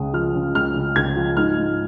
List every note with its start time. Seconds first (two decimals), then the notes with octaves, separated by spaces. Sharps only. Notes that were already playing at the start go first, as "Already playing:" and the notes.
Already playing: C#2 C#3 D#6
0.13 F3 F6
0.34 C#3
0.55 C#2 F6
0.75 C#3
0.96 C#2 G#6
1.16 F3
1.37 G#2 F6
1.57 G#2